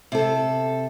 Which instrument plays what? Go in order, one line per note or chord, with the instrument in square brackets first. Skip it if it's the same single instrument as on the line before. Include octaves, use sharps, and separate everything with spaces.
[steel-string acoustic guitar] C3 A4